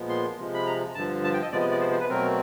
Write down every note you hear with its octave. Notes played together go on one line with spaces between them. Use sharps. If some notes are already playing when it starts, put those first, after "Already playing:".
Already playing: A#2 F3 G#3 B3
C6
C3 F3 G#3
B5
A#5
G2 D3 F3 A5
A5
G5
D#5
C3 F3 G#3 B3 D5
D#5
D5
C5
C5
B4
B2 F#3 A3 C4 A#4